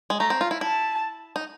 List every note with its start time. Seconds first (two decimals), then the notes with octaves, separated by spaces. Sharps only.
0.10 G#3
0.20 A3 A#5
0.30 C4
0.41 F4
0.51 E4
0.61 E4 A5
1.36 D#4